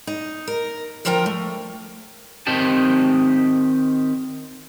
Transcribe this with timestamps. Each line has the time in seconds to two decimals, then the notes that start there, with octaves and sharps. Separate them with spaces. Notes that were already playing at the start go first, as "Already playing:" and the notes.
0.07 D#4
0.47 A#4
1.05 F2 D3 F3 A#4 G5 A#5
1.26 A3
2.47 D#3 C4 D#4 G4 A5